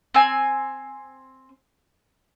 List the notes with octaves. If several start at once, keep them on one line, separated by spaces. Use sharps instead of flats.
C4 G#5